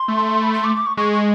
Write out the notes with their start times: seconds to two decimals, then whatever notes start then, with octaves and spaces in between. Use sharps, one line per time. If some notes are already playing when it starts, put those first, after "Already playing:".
Already playing: C6
0.08 A3
0.43 B5
0.53 C6
0.64 D6
0.75 D6
0.86 C#6
0.97 G#3 C#6
1.13 C#6